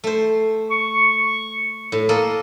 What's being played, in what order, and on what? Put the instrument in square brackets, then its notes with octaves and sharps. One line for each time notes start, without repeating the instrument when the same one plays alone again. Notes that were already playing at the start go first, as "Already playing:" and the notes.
[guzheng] A3 C5
[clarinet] C#6
[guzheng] A2
A#3 A4 D#5